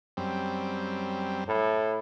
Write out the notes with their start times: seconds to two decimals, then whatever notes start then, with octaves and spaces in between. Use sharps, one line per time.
0.17 F#2 G3 C4
1.48 A2